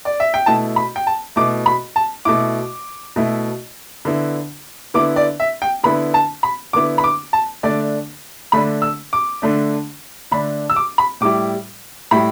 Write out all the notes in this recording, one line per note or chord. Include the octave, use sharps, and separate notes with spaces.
D5
E5
G5
B2 A3 E4 A5
B5
G5
A5
B2 A3 E4 D6
B5
A5
B2 A3 E4 D6
B2 A3 E4
D3 B3 E4
D3 B3 E4 D6
D5
E5
G5
D3 B3 E4 B5
A5
B5
D3 B3 E4 D6
B5
D6
A5
D3 A3 D4 D5
D3 A3 D4 B5
E6
D6
D3 A3 D4
D3 A3 D4 B5
E6
D6
B5
A2 G3 E4 D6
A2 G3 E4 B5